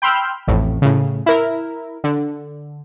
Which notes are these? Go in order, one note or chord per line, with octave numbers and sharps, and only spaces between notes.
G5 B5 C6 E6 F6 G6
A1 F2 A2
A2 C#3
E4 A#4
D3